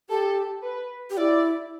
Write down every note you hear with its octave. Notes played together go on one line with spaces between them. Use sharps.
G4 A4
B4
G4
E4 D5